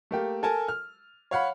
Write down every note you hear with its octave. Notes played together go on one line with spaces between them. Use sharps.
A3 A#3 G4
A4 A#4 G#5 A5
F6
C#5 F5 F#5 B5